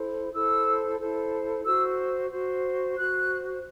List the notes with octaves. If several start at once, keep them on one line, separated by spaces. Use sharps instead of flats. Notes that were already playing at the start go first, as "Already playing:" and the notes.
Already playing: E4 A4 C5
E4 A4 C5 E6
E4 A4 C5
F#4 C5 E6
F#4 C5
F#4 C5 F#6